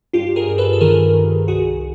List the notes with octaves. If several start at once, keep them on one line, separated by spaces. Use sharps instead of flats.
G2 F4 G4
G#4 A#4
G2
A4 B4
A4
D#3 G#4 A#4
D#3
C2 F#4 G#4